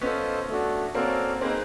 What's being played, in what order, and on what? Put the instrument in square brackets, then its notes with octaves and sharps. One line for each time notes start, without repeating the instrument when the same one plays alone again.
[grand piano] B3 C#4 [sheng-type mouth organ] F4 A4 C5 D#5
[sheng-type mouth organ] A3 D4 F#4
[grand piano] A#3 C4 [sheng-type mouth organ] C#4 F#4 A4 D5 F5
[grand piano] A#3 C4 [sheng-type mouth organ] D#4 G#4 B4 D#5